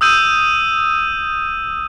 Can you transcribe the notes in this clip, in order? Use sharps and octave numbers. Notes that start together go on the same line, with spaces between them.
D#6 E6 G6 D#7